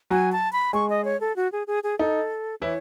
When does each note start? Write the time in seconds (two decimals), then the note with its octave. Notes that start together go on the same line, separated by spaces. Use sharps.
0.10 F#3 F#4 G#5
0.32 A5
0.53 B5
0.73 G#3 G#4 C#6
0.90 D#5
1.05 C#5
1.21 A4
1.36 F#4
1.52 G#4
1.67 G#4
1.83 G#4
1.99 D#4 A4
2.62 E3 E4 C#5